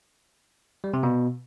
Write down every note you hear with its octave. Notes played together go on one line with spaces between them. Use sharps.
G3
C3
B2